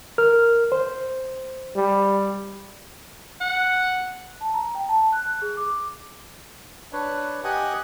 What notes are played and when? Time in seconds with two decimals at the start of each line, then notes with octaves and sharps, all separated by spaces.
0.18 A#4 F6
0.72 C5
1.76 G3
3.41 F#5
4.41 A5
4.54 A#5
4.75 G5
4.89 A5
5.12 F#6
5.24 F#6
5.42 G#4
5.57 D6
6.93 D4 B4 C#5
7.44 G4 D#5 F#5 G#5 D#6 F#6